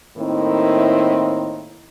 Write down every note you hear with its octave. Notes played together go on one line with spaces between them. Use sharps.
A2 D#3 A#3 C4 D#4 E4